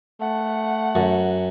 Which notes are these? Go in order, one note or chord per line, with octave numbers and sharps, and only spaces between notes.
A3 F#5
F#2